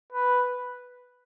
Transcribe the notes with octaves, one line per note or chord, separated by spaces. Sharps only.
B4